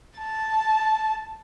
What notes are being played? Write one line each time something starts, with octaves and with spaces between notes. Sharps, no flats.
A5